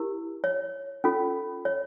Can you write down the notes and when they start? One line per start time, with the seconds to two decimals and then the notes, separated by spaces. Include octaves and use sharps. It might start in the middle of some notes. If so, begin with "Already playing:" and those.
Already playing: E4 G4 A#4
0.44 C#5
1.04 C#4 F4 A4
1.65 C#5